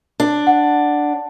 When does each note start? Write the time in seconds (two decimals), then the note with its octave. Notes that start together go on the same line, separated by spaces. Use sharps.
0.20 D4
0.47 F#5